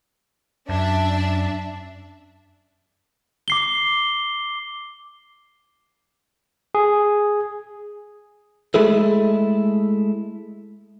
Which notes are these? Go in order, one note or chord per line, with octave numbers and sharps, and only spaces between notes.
F#2 D4 E5
D6 C7 G7
G#4
G#3 A3 E4 G#4 A4